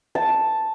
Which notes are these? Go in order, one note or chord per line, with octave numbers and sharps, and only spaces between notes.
A5